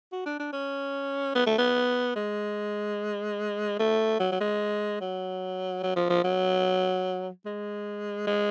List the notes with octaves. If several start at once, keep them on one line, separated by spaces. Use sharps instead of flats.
F#4
D4
D4
C#4
B3
A3
B3
G#3
A3
F#3
F#3
G#3
F#3
F#3
F3
F3
F#3
G#3
G#3